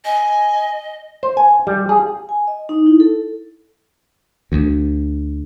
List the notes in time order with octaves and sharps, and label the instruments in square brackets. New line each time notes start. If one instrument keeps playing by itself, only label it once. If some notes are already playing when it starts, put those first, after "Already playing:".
[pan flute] D#5 [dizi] G#5
[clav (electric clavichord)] C5
G#5
G3
G#4
[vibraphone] G#5
D#5
D#4
E4
A4
[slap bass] D2